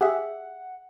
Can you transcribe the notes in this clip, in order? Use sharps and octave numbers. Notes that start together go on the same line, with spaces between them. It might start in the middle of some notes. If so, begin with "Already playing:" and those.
G4 G#4 E5 F#5